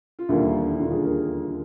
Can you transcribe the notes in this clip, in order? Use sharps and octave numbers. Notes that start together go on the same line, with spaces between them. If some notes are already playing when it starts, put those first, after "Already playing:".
F4
E1 D#2 D3 G3 A#3 E4
E4
E1 D#2 D3 G3 A#3 F4
G#4
A#4